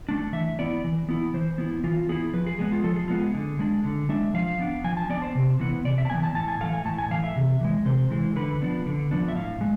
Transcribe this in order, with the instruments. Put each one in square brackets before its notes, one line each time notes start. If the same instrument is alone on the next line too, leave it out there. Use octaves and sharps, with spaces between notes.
[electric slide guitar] A3 D4
E3 E5
B3 E4 D5
E3
B3 E4
E3 C5
B3 E4
E3 F4
B3 E4 G#4
F3 B4
G#4
G#3 B3 G#4
F4
F3 A4
G#4
G#3 B3 F4
G#4
D3
G#3 D4
D3
G#3 D4 E5
F3 F5
B3 D4
F3 G#5
A5
B3 D4 D5
C5
C3
E3 B3
C3 D5
E5
A5
E3 B3 G#5
A5
A2 A5
G#5
E3 A3 F5
G#5
A2 A5
G#5
E3 A3 F5
E5
C3
E3 G#3
C3 C5
E3 G#3
D3 B4
F3 B3 D4
D3
F3 B3 D4
E5
A2 F5
G#3